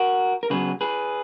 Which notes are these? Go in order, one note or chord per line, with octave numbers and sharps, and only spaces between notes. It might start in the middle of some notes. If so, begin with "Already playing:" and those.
Already playing: F#4 A#4
A#4
C#3 F#3 B3 G#4 B4
G#4 B4